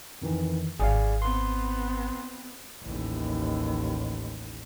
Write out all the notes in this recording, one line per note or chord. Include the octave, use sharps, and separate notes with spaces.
F2 D#3 E3
G#1 G#4 D5 F5
B3 C4 C6
A1 D#2